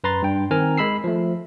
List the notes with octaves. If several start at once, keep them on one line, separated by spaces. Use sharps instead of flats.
F#2 B4 A#5 C6 A6
G2 G5
D#3 C4 A#4 G#5 A#5 F6
G#3 B5 E6 C7
F3 A3